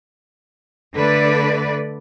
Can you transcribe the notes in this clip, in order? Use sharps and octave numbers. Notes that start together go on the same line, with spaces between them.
D3 A3 B4 D5